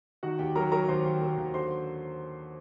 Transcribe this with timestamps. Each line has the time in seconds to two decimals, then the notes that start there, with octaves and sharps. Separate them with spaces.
0.23 D#3 F#4 F#5
0.39 D#2 G4 G5
0.56 F#3 A#4 A#5
0.72 F#3 A#4 A#5
0.88 D#2 C5 C6
1.05 D#2
1.21 F#3
1.37 D#2
1.54 D3 C5 C6